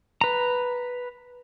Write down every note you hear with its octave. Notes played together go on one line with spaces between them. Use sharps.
B4 A#5